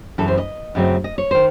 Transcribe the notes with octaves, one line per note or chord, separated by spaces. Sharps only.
F#2 C#3 E3 A4
C5
D#5
F#2 C#3 F#3 A3 C4
D#5
C#5
D#3 C5